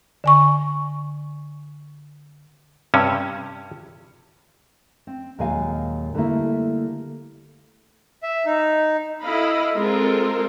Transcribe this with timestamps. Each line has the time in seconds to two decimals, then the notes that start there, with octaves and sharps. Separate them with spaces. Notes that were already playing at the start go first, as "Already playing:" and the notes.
0.24 D3 G#5 C#6
2.94 G2 C3 C#4
5.07 C4
5.39 D#2 A#2 F#3 G#3 F5 G#5
6.14 D3 G3 A3 A#3 E4
8.23 E5
8.45 D#4
9.22 E4 A4 D#5 F5 B5
9.75 G#3 C4 F4 A4 A#4